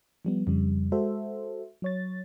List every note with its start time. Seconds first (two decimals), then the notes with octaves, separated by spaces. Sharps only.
0.25 F3 G3 B3
0.47 F2 C#3 G3
0.92 G#3 F#4 A4 C5 E5
1.82 F#3 C#5 A6